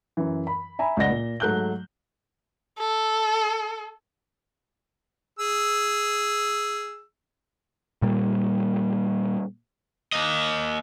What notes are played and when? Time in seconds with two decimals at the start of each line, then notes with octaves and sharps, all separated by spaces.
0.17 F#2 E3
0.47 B5
0.79 E5 G#5 A#5 B5
0.97 C#2 D5 D#5 F#5 A#6 G7
1.10 A#2
1.40 G#2 F#3 A3 F#6 G6 G7
2.78 A4
5.39 G#4 E6
8.02 A#2 G3 A#3
10.12 A#3 D#5